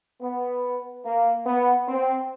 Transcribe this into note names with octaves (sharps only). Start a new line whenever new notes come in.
B3
A#3
B3
C4